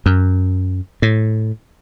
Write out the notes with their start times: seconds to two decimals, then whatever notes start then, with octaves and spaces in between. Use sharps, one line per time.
0.06 F#2
1.02 A2